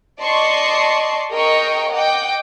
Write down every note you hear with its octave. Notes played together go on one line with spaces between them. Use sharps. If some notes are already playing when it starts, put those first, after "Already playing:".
D5 D#5 A5 C6 C#6 C7
G#4 A#4 D#5 G5 C#6
D#5 F#5 G5 D6